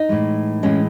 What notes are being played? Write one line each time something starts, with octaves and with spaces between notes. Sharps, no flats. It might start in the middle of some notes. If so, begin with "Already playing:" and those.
Already playing: D#4
A2 E3 G#3
A2 E3 G#3 C#4